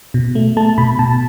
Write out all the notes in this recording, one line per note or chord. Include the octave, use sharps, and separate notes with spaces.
B2
A3
A3 A5
B2 B5
B2 A5